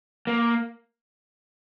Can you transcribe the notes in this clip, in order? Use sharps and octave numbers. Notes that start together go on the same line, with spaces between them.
A#3